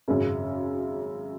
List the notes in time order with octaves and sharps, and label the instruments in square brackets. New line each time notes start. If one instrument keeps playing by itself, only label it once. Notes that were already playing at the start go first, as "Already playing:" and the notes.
[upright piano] G#1 F#2 C#3